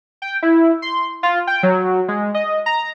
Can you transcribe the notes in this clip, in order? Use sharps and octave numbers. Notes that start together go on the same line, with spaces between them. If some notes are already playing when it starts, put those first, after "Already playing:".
G5
E4
C6
F4
G5
F#3
G#3
D#5
A#5